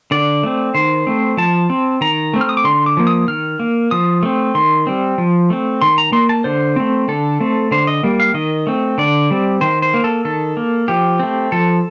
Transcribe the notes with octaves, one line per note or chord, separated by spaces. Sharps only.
D3 D5
A3 C4
D#3 C5
A3 C4
F3 A5
C4
D#3 A#5
A3 C4
F6
D#6
D6
D3 C6
D6
F3 A#3
D#6
D#3 F6
A#3
F3 D#6
A3 C4
D#3 C6
G3 C4
F3
A3 C4
D#3 C6
A#5
A#3 C6
A5
D3 C5
A3 C4
D3 A4
A3 C4
D3 C5
D#5
G3 A#3
F5
D#3 D#5
A3 C4
D3 D5
G3 C4
D#3 C5
C5
A#3
A4
D#3 A4
A#3
F3 G4
A3 C4
F3 A4